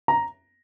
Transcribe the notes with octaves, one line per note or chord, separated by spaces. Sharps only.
A#5